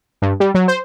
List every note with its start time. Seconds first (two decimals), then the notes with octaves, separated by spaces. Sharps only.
0.22 G2
0.40 G3
0.55 F#3
0.68 C5